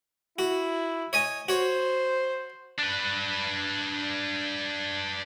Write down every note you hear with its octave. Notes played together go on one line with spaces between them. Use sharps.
E4 F#4
C#5 D#5 G#5
F#4 C5 C#5
D4 B4